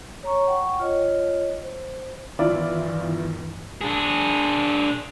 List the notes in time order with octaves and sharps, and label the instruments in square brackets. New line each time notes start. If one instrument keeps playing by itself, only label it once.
[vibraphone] C#5 A#5 C#6
F#5 G5 C#6
F4 C#5 D#5
C5
[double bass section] G2 B2 E3 [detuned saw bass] D#3 [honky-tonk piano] E4 F4 D5
[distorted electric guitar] D4 G#4